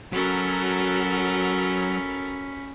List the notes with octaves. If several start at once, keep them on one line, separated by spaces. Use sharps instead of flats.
F#3 C#4 F#4 A4 A#4 B5